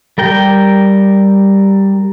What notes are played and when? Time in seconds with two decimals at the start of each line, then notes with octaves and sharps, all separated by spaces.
0.18 G3 A#4 G5